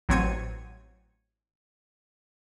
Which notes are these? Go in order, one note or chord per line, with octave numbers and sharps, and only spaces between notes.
A1 F#3 C4 C#5 G#6 D#7